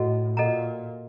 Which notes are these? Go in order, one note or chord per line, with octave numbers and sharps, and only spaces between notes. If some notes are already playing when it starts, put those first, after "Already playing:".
Already playing: A2 F#4 A4 D#5 F#5
A#2 A4 D#5 F#5 A#5